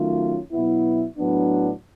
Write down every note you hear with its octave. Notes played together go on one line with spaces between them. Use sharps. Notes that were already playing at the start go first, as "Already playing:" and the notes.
Already playing: D#3 F#3 A3 C#4 F4
B2 F#3 B3 E4
A2 F#3 B3 D4